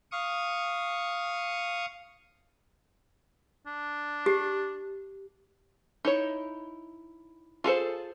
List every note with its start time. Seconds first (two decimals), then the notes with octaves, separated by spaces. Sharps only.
0.12 F5 C#6 D#6
3.67 D4
4.26 G4
6.05 D#4 E4 C#5
7.64 F4 G#4 A4 C5